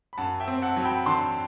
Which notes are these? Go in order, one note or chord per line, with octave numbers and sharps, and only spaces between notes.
B5
F#2 F#5 A5
E5 G5
C4
F#5 A5
F#3
G5 B5
D3 A5 C6